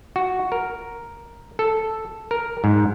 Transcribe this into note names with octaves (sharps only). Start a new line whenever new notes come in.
F#4
A#4
A4
A#4
G#2